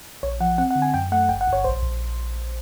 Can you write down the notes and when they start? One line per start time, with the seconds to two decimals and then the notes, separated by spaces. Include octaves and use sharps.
0.23 A#1 C#5
0.40 F3 F#5
0.58 C4 F#5
0.71 F#5
0.76 D3
0.82 G#5
0.94 F#2 G5
1.12 A3 F#5
1.29 G1 G5
1.41 F#5
1.47 G1
1.53 C#5
1.64 A#1 C5
1.82 A#1